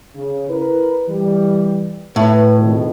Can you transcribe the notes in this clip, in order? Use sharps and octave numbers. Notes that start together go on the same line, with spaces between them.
C#3
E4 A#4 B4
E3 G3
A2 B4
G#1 F2 B2